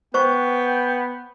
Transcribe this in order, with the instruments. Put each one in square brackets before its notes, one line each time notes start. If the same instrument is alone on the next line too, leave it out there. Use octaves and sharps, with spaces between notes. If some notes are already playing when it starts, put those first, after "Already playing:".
[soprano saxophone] B3 [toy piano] C5 C#6 [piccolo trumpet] G5